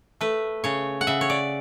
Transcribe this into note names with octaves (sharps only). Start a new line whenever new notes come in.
A3 B4
C#3 C#5
F#5
C#3 E5
C#5
D5